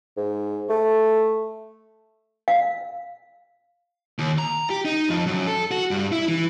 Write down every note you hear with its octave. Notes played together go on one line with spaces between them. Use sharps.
G#2
A3
F5
D#2
A#5
G4
D#4
F2
F#2
A4
F#4
G2
E4
E3